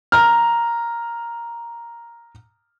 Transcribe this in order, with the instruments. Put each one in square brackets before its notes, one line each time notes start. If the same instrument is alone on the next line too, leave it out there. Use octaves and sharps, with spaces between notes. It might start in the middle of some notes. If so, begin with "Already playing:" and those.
[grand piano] A#5 F6